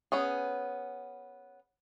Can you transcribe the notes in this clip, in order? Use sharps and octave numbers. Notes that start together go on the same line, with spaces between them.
B3 C#4 G#4